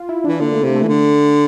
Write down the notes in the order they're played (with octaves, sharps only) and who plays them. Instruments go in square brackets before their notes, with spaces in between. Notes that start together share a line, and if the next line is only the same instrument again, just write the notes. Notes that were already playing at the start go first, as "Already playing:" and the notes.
Already playing: [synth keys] F4
E4
[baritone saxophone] E3 [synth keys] D4
[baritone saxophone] D3 [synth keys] A#3
[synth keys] A3
[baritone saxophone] C3 [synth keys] E4
[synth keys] A3
[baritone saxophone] E3
D3